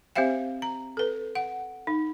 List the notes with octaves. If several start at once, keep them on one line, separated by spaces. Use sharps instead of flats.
C4 G4 C5 E5 F5 G5
A#5
A4 B4
F#5
D#4